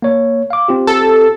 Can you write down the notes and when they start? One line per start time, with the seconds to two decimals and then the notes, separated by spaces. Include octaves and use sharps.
0.02 A#3 C#5
0.50 F5 D6
0.68 C4 F4 G4
0.87 A4